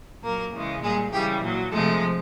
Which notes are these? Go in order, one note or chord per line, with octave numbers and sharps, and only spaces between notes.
A#2 F#3 A#3 A#4
C#3 E3 G#3
A#2 G3 G#3 G#4
C#3 E3 G3 G4
A#2 F#3
C3 F3 G#3 A3 A4